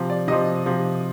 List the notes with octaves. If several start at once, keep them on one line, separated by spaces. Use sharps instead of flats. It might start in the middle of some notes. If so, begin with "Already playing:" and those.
Already playing: C3 F3
D5
C3 F3 D#5
C3 F3